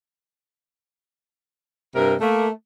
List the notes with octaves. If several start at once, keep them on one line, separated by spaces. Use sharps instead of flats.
G2 C3 A#4
A3 A#3